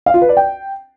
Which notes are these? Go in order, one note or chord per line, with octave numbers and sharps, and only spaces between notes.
F5
F4
B4
D5
G5